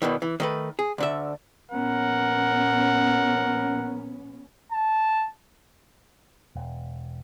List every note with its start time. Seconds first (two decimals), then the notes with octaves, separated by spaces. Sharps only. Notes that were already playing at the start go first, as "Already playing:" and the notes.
0.02 E2 B2 D#3 E3
0.22 E3
0.40 D#3 A3 B4
0.79 G#4
0.98 D2 D3 E5
1.71 A#1 B3 C#4 A#4 F#5
4.72 A5
6.56 E1